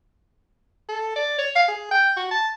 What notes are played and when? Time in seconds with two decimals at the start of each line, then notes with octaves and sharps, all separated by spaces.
0.89 A4
1.16 D5
1.38 C#5
1.55 F5
1.68 G#4
1.91 G5
2.17 F#4
2.31 A5